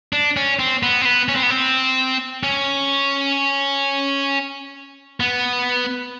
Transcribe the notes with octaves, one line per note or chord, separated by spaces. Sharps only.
D4
C#4
C4
B3
C4
B3
C#4
C4
B3
C4
C#4
B3